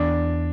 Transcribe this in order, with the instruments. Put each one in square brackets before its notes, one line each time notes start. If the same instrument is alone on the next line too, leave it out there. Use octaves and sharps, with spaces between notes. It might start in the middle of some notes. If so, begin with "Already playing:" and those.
Already playing: [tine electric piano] E2 [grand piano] D4